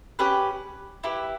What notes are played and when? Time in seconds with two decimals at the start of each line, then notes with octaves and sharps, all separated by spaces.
0.19 C#4 G4 B4
1.04 E4 G4 B4